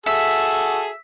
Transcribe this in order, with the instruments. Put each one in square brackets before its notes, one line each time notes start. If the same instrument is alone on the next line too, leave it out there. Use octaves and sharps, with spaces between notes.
[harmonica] F#4 G#4 A4 [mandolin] E5